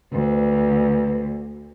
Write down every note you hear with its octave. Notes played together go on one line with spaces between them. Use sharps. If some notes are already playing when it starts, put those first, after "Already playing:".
D2 B4